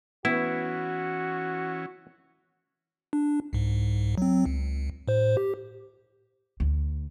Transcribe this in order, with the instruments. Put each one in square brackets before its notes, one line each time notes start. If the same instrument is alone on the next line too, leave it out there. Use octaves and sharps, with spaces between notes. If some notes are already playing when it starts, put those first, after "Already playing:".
[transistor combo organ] E3 C#4 [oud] B3 [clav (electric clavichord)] E4 [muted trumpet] F#4
[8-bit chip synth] D4
C2 G#2
F#3 C4
C#2
A2 C5
G4
[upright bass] D2